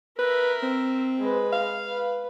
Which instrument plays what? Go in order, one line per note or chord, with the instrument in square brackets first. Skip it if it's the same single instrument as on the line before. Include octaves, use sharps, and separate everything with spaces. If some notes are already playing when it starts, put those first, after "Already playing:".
[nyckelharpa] A#4 E5 [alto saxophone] B4
[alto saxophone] C4
[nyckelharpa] G#3 B4
[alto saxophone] F5
[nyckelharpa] B4